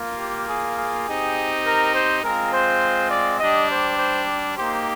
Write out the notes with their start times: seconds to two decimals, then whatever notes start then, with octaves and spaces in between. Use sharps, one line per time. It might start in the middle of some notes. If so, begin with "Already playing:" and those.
Already playing: A#3 F4
0.18 G4
0.47 G#4
0.77 G#4
1.06 C4 D#4 G4
1.64 A#4
1.93 C5
2.23 G#3 C4 F4 A#4
2.51 C5
3.11 D5
3.39 G3 D4 G4 D#5
3.69 C5
3.98 C5
4.56 A#3 D#4 G4 C5